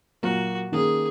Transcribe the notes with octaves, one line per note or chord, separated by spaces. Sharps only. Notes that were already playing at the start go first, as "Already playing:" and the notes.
A#2 F#3 A#3 F#4
D#3 A#3 C#4 G#4